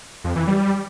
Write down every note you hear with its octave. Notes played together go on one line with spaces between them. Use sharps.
F2
E3
G3